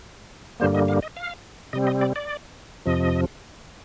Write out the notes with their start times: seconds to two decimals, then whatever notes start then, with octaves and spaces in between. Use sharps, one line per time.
0.60 G2 D3 G3 A#3 C5
0.74 D#5
0.88 F5
1.03 D#5
1.17 F5
1.73 C3 G3 C4 D#5
1.87 D#5
2.01 D5
2.16 D5
2.86 F2 C3 F3 D#5